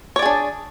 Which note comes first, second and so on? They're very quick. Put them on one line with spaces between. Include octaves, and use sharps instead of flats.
C#5 D5 G#4 D4